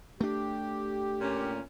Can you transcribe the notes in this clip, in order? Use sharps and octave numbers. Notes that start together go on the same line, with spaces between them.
A3 D4 G4
A#2 C#4